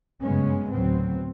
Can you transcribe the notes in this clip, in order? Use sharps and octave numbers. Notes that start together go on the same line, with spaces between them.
F#1 G2 C#3 G#3 B3 C#4
D2 A2 F#3 B3 C4